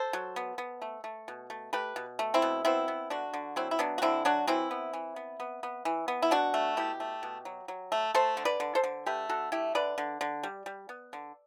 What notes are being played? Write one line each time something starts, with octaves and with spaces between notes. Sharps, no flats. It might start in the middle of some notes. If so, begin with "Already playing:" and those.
Already playing: A4 C5
F#3
B3
B3
A3
A3
B2
A3
A3 G4 B4
B2
A3
C4 E4
B2
B3 C4 E4
B3
D3 D4 F#4
D3
F#3 C4 E4
E4
F#3 B3 D4
F#4
D3 C4 E4
F#3 D4 F#4
E3 C4 E4
B3
E3
B3
B3
B3
E3
B3
E4
B2 D4 F#4
A3
B2 E4 G4
A3
B2
F#3
F#3
A3
A3 A4 C5
D3
B4 D5
D3
A4 C5
D3
A3 G4 B4
D3 F#4 A4
A3 E4 G4
D3 B4 D5
D3
D3
G3
G3
B3
D3